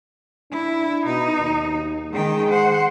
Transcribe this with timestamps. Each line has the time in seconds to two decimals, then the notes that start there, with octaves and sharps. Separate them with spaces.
0.51 D4 E4
1.06 B2 D#4
1.39 D#2
2.12 D#3 G#3 G5
2.51 C5 F#5